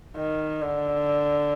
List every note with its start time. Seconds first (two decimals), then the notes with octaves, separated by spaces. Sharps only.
0.17 D#3
0.62 D3